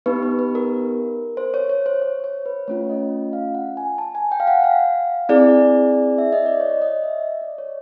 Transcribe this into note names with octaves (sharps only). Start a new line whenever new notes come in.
B3 D#4 G4 B4
B4
B4
A#4
C5
C#5
C#5
C5
C#5
C#5
B4
A3 C#4 F4 C#5
D#5
F5
F#5
G#5
A5
G#5
G5
F5
F#5
F5
C4 E4 G#4 D5
E5
D#5
D5
C#5
D#5
E5
D#5
D5
C#5